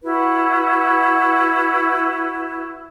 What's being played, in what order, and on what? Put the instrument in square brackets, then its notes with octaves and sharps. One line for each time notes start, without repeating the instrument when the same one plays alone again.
[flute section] E4 F#4 B4